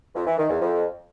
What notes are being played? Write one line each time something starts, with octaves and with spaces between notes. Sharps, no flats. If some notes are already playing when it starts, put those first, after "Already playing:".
F2
E3
D#3
E2
F2